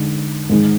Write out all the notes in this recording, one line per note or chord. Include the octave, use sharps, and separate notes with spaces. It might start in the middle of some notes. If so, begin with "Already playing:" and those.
Already playing: D3 G#3 D#4
G#2 D#3 G#3